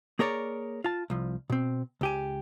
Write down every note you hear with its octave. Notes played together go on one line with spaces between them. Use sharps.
A#3 G#4 A#4 C#5 D5
F4 A5
C2 F3
B2 C4
C#2 G4 G#5